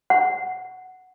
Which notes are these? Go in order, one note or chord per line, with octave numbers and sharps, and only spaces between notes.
F#5